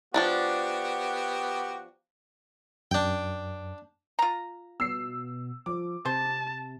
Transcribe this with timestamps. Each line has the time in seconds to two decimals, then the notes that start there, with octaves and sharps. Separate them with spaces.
0.14 F3 F#3 B3 D4 F#4 G4
2.91 F#2 D4 G5
4.19 F4 A#5
4.80 B2 E6 C7
5.66 F3 D6
6.05 C3 C5 A5